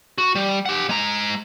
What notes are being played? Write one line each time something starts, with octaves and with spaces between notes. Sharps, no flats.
F#4
G3
G4 F#5
G#3 A#5